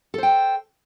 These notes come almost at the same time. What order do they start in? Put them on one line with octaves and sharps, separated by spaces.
A4 C5 G5